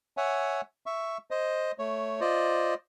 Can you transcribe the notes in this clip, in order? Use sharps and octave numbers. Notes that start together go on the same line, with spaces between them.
C#5 E5 F#5 G#5
E5 C#6
C5 D#5
A3 C#5
F4 C5 D5 D#5